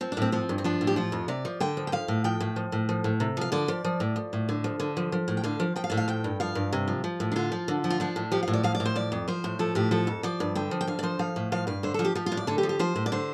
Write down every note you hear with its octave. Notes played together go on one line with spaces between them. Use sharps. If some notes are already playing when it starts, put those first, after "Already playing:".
F3 C4
D4
A2 C4
F3 C4
G2
C4
F3 D4
A2
G4
F3 F4
F2
C3 D5
F3
D3 G5
F3
G5
F3 F5
A2
F3 G5
A2
F3
A2
F3
A2
C3
F3 F5
D3 D5
F3
F3
A2
F3
A2
D3
F3
D3
F3
F3
A2
G5
D3 F5
F3
F3 G5
F5
A2 D5
F5
F3 G5
G2
F3 F5
G2
C3
F3
F3
A2
D4
D3 F4
F3
D3
F3
F4
F3 D4
A2
F3 G4
A2 F5
D5
F3 F5
D5
A2
C5
F3 D5
F2
F3 C5
A2
F3 A4
A2 G4
F3 A4
F2
F3 D5
G2
D3 G5
F3
G5
D3 F5
D5
F3 C5
F3 F5
A2
F3 F5
G2 F5
D3 C5
F3 A4
G4
F3 G4
F4
A2
D5
D3 A4
G4
F3
G4
F3 C5
A2
D5
D3 C5